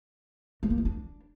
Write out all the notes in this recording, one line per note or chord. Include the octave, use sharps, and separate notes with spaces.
A3
A#3
E4
D4